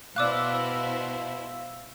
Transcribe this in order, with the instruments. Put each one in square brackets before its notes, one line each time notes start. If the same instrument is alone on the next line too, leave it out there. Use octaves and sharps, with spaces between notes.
[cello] B2 [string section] E4 C5 [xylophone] D5 D6 F#6 [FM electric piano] F5 E6